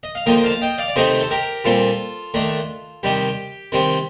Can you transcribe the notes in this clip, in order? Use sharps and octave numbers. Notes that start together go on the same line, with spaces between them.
D#5
F5
D3 F3 A#3 D#4 D#5 G5
F5 A5
D#5 G5
D5 F5
D5
C3 D#3 A3 C4 D#4 C5 D#5
A4
G4 A#4
A#2 G3 C4 F4 A4
D#3 A3 D4
C3 D#3 G3 G4
C3 D#3 G3 C4